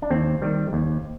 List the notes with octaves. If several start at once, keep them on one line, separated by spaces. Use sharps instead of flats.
D4
D#2 C4
D#3 G3
D#2